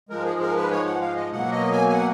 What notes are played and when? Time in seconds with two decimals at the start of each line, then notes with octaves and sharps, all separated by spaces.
0.09 G#2 F3 G#3 A#4
0.25 G#4
0.40 A#4
0.56 B4
0.71 C#5
0.85 F#5
1.01 F5
1.16 D#5
1.31 B2 F#3 A#3 F#5
1.52 D#5
1.72 G#5
1.89 G#5
1.93 F#5